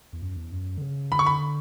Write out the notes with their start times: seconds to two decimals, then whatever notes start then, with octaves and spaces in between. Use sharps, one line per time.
0.13 E2
0.22 F#2
0.36 E2
0.52 F#2
0.78 D3
0.82 C#3
1.12 D3 B5
1.19 C#6
1.26 B5